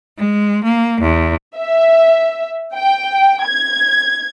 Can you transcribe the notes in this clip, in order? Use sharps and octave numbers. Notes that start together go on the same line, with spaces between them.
G#3
A#3
E2
E5
G5
G#6